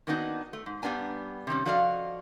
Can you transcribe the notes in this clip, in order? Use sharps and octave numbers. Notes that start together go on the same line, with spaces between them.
D#3 A#3 B3 D4 D#4 F#4
A3
G#2
G2 G3 B3 D4 G#5 A#5
C3 D#3 G3 C#4
F3 F#4 A4 D5 D#5 F5